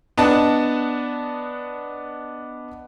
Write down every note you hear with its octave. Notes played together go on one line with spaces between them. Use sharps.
B3 D4 D#5 F#5 A5